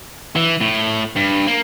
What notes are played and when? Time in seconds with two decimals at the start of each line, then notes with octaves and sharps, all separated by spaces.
0.36 E3
0.61 A2
1.16 G2
1.47 A#3